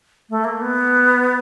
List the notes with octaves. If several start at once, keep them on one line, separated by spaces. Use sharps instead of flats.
A3
A#3
B3